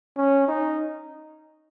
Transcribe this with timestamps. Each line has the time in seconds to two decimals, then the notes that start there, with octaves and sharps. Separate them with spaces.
0.17 C#4
0.48 D#4